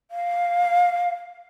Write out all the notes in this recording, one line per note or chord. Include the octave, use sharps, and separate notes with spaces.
F5